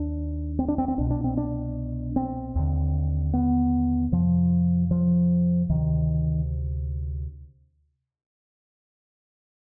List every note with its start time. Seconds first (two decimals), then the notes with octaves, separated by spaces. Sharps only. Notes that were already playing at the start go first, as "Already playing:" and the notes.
Already playing: D#2 D4
0.59 C4
0.68 D4
0.78 C4
0.88 C4
0.98 C2 B2 D4
1.10 D4
1.24 C4
1.37 D4
2.16 C4
2.55 D#2 D3
3.33 B3
4.12 F2 C3 F3
4.91 F3
5.69 D2 C3 D#3